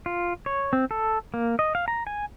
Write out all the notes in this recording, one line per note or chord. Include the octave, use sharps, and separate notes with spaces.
F4
C#5
C4
A4
A#3
D#5
F5
A#5
G#5